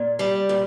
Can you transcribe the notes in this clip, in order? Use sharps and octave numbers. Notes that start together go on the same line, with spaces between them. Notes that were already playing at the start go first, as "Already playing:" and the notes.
Already playing: A#2
G3
A#2